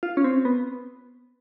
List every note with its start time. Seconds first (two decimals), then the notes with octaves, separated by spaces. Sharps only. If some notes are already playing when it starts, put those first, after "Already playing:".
0.03 F4
0.17 C#4
0.24 C4
0.45 B3